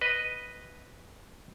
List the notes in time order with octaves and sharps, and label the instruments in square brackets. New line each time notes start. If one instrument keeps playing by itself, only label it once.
[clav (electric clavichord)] B4 D#5